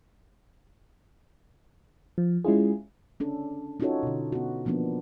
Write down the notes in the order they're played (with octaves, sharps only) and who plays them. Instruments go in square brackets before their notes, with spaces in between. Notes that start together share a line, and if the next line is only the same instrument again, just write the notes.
[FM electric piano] F3
G#3 C#4 E4 F4 G#4
[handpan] C#4 D4 A4
C#4 D#4 F4 F#4 A4 C#5
B2 D3
B3 F#4
E3 F3 A#3 B3 D4